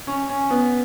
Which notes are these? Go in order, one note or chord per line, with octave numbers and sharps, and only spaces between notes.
C#4
C#4
B3